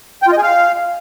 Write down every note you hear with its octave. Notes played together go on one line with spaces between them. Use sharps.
G5
F4
D#5
G#4
F5